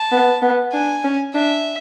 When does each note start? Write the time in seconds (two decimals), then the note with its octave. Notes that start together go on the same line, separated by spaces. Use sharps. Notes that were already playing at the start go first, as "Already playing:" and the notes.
Already playing: A5
0.12 B3
0.42 B3
0.73 D4 G#5
1.04 C#4
1.34 D4 E5